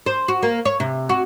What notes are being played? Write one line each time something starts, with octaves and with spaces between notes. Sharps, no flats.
C5
F#4
A#3
C#5
C3
F#4